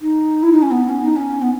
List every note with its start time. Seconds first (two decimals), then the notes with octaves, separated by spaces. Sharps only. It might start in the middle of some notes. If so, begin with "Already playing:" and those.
0.01 D#4
0.43 E4
0.52 D#4
0.62 C#4
0.71 B3
0.89 C#4
1.03 D#4
1.16 C#4
1.42 B3